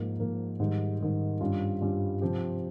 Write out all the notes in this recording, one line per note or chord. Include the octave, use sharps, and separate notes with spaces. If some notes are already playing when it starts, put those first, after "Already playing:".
Already playing: G#2 F3 A#3
G#2 F3 A#3
G#2 D#3 G3
G#2 D#3 G3
G2 G3 C#4 F4
G2 G3 C#4 F4
C3 F3 C4 G4